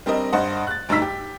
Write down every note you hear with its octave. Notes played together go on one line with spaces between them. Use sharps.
G3 C4 D4 A#4 D#5
G2 C5 D#5 F#5
F#6 A6
D2 G2 D#4 A#5 E6 B6
G4